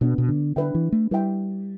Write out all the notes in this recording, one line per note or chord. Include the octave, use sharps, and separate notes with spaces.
B2 B3 D4 B4
B2
D3
D3 D4 B4 E5 G5
E3
A3
G3 E4 B4 E5 G5